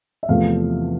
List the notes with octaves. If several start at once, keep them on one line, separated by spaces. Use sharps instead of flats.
E5
E2 C3 F3 A3 F5